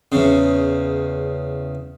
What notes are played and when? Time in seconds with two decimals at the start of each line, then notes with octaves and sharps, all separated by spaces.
0.12 E2 C#3